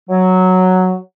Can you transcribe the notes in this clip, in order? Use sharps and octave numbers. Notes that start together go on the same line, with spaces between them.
F#3